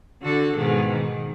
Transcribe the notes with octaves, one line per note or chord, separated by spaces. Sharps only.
D3 F#4 A4
G#2 B2 D#3
D#3